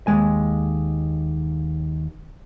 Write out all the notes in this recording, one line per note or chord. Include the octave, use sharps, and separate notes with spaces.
D#2 G#3 G#5